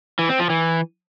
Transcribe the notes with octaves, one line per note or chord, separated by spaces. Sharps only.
E3
C4
F3
E3